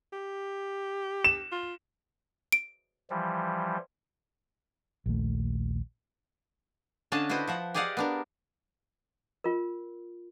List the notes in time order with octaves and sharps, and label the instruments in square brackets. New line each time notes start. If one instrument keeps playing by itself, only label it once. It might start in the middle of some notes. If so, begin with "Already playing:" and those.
[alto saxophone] G4
[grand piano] E7
[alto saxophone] F4
[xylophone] D7
[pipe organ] E3 F3 G3
[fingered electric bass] A#1 D#2 A3
[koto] D3 C#4 D4 D#5 F5 A5
E4 F#4 B4 C5 D#5
F3 E5 F#5
G4 G#4 D5 D#5 F5 F#5
B3 D4 A#4
[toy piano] F4 A#4